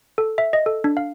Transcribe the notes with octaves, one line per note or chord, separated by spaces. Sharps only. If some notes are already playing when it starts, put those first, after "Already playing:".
A4
E5
D#5
A4
D4
F5